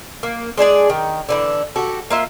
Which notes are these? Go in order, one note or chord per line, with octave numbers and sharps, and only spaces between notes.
A#3
G#3 D4 G#4 D5
D#3
D3 E3 D4
F#4 G4 A4
A#3 F4 E5